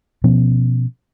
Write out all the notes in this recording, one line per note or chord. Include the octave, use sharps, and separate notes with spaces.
B2 F3 B3 C#4